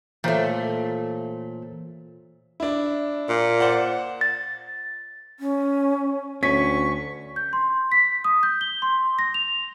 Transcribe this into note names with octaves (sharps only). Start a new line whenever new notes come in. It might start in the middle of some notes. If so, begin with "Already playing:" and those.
A#2 E3 A3 C5 C#5
D4 E4
A#2
C5 D5 F#5
A6
C#4
D2 C#4 C#6 B6
G6
C6
B6
D#6
G6
G7
C6
A#6
F7